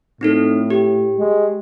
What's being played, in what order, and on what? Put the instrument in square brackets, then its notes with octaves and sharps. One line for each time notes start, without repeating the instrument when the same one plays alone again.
[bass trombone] A2 [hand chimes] C4 D#4 A4
[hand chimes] G4
[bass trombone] G#3